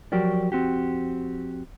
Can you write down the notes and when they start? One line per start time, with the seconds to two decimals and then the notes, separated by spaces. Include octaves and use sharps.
0.12 F3 F#3 F#4 G4 A#4 D5
0.52 F2 C4 F#4 G4